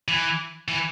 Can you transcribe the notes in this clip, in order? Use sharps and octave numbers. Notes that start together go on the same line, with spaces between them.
E3
E3